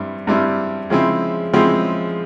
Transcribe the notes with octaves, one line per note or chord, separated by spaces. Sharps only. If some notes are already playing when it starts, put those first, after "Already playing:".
Already playing: G2 G3 C4 E4
G2 G3 C4 E4
C#3 F3 G#3 C4 E4
C#3 F3 G#3 C4 E4